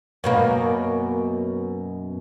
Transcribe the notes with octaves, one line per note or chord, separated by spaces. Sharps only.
F#2 B2 A#3